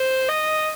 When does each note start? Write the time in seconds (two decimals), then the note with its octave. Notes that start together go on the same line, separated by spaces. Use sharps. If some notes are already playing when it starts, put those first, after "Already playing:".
Already playing: C5
0.29 D#5